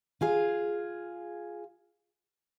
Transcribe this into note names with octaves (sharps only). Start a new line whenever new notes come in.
F4 G#4 F5